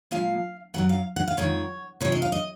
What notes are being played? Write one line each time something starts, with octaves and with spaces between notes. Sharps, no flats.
A#2 F3 G#3 F5
F#2 D#3 F#3 F#5
F5
F#5
F5
F2 D#3 G#3 C#5
C3 F3 G#3 C#5
D#5
F5
D#5